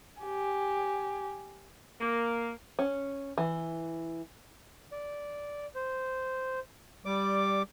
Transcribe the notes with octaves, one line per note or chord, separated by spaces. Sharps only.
G4 G#5
A#3
C#4
E3
D5
C5
G3 D5 D6